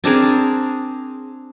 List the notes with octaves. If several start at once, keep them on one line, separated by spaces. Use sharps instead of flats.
C4 D4 G#4 A#4